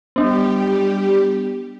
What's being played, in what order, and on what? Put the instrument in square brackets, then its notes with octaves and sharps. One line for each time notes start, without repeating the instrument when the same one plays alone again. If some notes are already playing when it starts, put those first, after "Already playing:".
[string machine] G3 G4 [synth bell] B3 D4